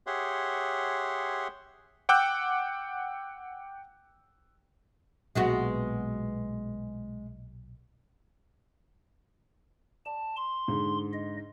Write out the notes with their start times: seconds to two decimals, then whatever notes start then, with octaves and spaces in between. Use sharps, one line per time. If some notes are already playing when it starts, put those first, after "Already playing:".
0.07 G4 G#4 C#5 E5 F#5 C6
2.09 F#5 G5 D6 E6 F#6 G6
5.35 B1 A#2 G#3 B3 F#4
10.06 D5 A5
10.37 C6
10.68 G#2 D3
11.13 D#5